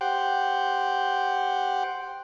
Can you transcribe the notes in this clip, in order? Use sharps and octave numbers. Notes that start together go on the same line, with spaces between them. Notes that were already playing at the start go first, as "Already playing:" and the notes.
G4 C5 F#5 G5